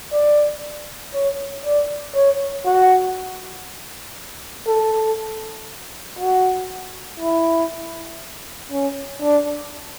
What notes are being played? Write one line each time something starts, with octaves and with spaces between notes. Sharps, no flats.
D5
C#5
D5
C#5
F#4
A4
F#4
E4
C#4
D4